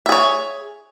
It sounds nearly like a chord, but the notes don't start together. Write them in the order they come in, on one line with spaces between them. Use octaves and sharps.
E5 G#4 C#5